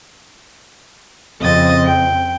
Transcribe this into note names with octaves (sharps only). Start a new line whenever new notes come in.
F2 C#3 C4 D#5 D#6 A6
G5